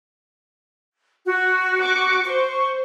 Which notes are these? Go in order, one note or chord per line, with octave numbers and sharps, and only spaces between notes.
F#4
C#6 D6
C5 C#6